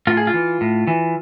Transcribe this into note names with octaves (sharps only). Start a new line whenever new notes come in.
A2 F4
G#4
F4
E3
A2
E3